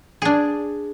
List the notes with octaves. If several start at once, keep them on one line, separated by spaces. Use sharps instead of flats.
D4 G#4